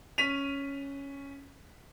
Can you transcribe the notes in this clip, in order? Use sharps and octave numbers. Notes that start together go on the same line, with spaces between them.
C#4 B6 D#7 F7